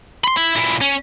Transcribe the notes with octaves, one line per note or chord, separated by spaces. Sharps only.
B5 C6
E4
A#2 E4
C#4